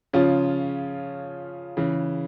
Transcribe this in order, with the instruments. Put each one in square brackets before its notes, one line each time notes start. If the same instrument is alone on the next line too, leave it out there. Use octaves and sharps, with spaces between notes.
[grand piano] C#3 F3 C#4 F4
C#3 E3